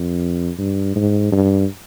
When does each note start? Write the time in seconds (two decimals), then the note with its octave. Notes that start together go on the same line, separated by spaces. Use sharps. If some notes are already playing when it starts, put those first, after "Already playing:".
Already playing: F2
0.58 G2
0.95 G#2
1.32 G2